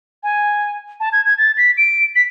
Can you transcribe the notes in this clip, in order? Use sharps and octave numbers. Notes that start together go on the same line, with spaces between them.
G#5
A5
G#6
G#6
A6
B6
D7
B6